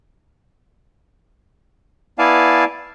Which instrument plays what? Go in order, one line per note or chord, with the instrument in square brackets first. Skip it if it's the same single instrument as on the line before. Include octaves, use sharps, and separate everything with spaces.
[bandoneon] B3 E4 D5 F5 G#5 A5